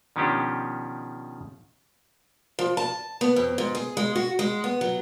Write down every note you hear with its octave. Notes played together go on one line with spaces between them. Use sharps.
B2 D#3 F3 C#4 D4 G4
F3
A5
B3
F2
G#2
G#4
G#3
F#4
G#3
B3
F#3